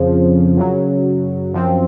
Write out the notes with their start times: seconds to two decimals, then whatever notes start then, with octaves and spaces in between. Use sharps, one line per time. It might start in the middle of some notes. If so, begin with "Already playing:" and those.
Already playing: F2 C#3 F3
0.57 F#2 C#3 F#3
1.54 F#2 F3 C4